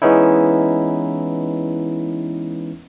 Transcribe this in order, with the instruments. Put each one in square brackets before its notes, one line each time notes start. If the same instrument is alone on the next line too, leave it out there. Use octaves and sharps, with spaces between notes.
[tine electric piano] E3 G#3 B3 C#4 D#4 E4